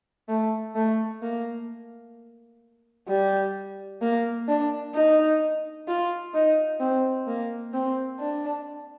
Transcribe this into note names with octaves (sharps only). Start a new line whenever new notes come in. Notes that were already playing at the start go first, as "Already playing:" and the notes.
A3
A3
A#3
G3
A#3
D4
D#4
F4
D#4
C4
A#3
C4
D4